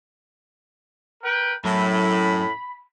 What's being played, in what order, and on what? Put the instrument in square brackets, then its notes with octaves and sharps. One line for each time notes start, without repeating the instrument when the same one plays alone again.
[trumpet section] A#4 B4 G5
[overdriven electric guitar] F#2 [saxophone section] A2 [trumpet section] B5